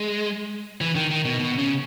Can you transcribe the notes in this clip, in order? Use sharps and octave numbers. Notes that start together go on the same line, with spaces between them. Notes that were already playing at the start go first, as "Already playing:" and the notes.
Already playing: G#3
E3
D#3
D#3
B2
B2
C#3